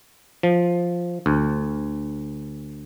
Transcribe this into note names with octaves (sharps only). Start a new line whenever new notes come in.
F3
D2